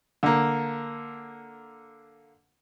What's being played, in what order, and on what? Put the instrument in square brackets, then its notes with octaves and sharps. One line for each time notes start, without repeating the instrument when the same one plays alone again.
[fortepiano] D3 A#3